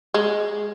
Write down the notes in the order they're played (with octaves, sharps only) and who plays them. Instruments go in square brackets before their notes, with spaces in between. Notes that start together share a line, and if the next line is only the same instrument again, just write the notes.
[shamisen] G#3